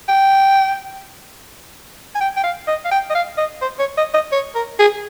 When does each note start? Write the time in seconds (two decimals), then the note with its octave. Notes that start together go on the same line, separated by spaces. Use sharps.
0.09 G5
2.15 G#5
2.21 G5
2.37 G5
2.44 F5
2.68 D#5
2.85 F5
2.91 G5
3.10 D#5
3.15 F5
3.38 D#5
3.62 C5
3.80 C#5
3.98 D#5
4.14 D#5
4.32 C#5
4.55 A#4
4.79 G#4